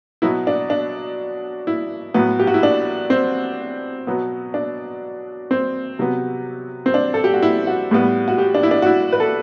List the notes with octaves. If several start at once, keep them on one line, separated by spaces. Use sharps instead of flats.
B2 F#3 B3 E4
D4
D4
E4
A2 F#3 B3
G4
F#4
E4
D4
C4
B2 F#3 B3
D4
C4
C3 F#3 B3
C4
D4
A4
G4
F#4
E4
F#4
A2 G3 B3
F#4
G4
D4
E4
D4
F#4
E4
B4
A4